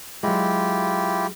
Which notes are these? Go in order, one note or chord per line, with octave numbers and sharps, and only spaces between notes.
F#3 G#3 E4 F4 G4